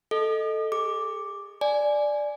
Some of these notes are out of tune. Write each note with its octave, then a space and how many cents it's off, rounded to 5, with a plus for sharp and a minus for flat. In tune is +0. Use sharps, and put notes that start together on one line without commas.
A4 +0 D#5 +0 D#6 -35
G#4 -45 D6 +0
D5 +5 G#5 +10